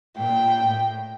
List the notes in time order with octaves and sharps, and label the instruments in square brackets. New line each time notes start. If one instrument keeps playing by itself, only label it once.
[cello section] A#2 [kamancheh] G5
[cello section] A2